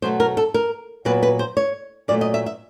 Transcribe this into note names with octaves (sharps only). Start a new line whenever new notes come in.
B2 F#3 A3 C5
A#4
A4
A#4
A#2 F#3 B3 B4
B4
C5
C#5
A#2 F#3 A3 D5
D#5
E5
E5